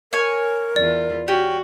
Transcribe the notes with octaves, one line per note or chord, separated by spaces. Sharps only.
A#4 C#5 G#5
E2 F4 D5
C#4 F#4 G4